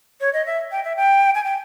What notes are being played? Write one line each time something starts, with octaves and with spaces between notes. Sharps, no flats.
C#5
D#5
E5
G5
E5
G5
G#5
G5